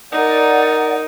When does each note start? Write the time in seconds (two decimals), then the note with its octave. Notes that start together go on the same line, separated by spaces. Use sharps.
0.12 D#4 A#4 D5 F#5